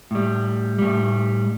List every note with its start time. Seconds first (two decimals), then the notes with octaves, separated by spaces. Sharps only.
0.11 A2 G3
0.79 A2 G3